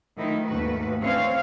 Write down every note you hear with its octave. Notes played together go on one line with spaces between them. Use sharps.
D#3 F3 A3 D#4 E4
D#2 G#2 A3 F#4 B4
D3 E3 C4 C#5 F5